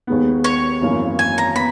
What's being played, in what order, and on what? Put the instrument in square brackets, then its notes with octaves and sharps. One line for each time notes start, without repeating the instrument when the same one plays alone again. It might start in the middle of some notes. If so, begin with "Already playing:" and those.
[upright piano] D#2 D#3 G#3 B3
[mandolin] C#5
[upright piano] G#1 F#2 E3 A#3 E4
[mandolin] G#5
A#5
[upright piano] B3 [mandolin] B5